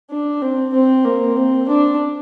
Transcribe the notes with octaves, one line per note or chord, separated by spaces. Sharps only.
D4
C4
C4
A#3
C4
D4